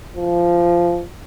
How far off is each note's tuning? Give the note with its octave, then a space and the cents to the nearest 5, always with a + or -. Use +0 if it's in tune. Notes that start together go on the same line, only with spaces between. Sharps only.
F3 -15